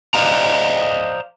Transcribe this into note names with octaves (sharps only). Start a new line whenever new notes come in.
C5 D5 D#5 F5 A#5